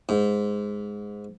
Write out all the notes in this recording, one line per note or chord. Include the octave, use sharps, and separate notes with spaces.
G#2